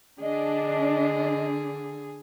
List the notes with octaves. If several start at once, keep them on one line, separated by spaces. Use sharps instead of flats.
D3 D4 G#4 D#5